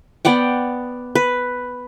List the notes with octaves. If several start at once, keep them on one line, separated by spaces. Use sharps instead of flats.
B3 D5 F#5 G5
B4